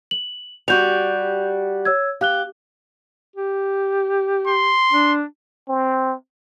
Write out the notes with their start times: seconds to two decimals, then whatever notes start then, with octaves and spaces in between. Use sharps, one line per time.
0.11 F#7
0.68 G3 F#4 G4 G6 F7
1.85 C#5 E6 G#6
2.21 G4 F5 F#6 G7
3.36 G4
4.48 C6
4.92 D4
5.68 C4